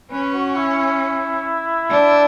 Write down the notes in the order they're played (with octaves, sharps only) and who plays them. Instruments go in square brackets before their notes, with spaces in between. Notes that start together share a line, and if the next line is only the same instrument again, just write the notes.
[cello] C#4 [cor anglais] B4
[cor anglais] F#4
E4
E4
[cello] D4